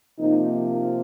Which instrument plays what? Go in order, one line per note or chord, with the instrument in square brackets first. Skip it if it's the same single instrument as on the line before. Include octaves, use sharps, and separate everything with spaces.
[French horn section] C3 F3 A#3 D#4